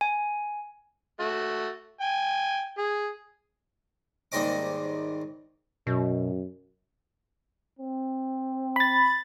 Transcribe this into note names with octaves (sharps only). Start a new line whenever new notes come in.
G#5
A3 F#4
G5 G#5
G#4
D#2 G#2 G3 C4 D#5 D6
F#2 B2
C4
B5 A6